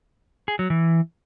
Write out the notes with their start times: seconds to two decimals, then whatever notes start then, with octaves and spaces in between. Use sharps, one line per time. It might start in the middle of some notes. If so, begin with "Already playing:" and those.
0.48 G#4
0.59 F#3
0.70 E3